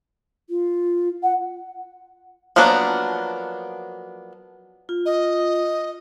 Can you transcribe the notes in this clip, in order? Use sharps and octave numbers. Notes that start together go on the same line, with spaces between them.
F4
F#5
F3 F#3 A#3 B3 D4
F4
D#5